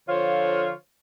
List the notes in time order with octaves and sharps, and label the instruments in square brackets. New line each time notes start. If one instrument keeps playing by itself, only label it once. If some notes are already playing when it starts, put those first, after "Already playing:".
[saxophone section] D3 F3 F4 C5 C#5